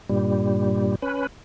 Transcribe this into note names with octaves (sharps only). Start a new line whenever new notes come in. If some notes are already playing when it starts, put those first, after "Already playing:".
G2 A#2 G3
C#4 B4